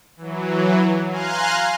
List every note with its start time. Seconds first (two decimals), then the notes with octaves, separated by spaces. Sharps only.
0.17 E3 F#3
1.10 F5 G#5 A#5 C6 F6 F#6